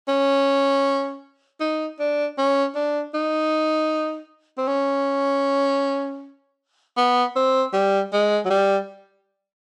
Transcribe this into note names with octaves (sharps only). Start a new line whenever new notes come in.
C#4
D#4
D4
C#4
D4
D#4
C4
C#4
B3
C4
G3
G#3
F#3
G3